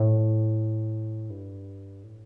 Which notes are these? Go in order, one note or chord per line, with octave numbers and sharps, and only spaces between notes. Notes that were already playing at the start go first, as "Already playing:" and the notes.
Already playing: A2
G2
A2